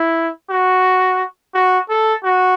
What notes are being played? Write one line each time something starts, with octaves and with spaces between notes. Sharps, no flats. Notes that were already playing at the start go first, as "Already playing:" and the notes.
Already playing: E4
F#4
F#4
A4
F#4